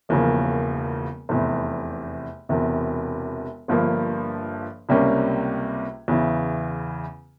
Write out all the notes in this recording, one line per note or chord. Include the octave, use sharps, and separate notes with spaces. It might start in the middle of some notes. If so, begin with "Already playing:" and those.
E1 E2 C#3 F3 A#3
F1 E2 C3
E1 E2 C3
G1 G2 F3 A#3
C#2 C3 G3 A#3 C#4
E2 C#3 E3